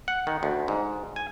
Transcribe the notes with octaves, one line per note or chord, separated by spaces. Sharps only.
F#5
D#3
D2
G#2
G#5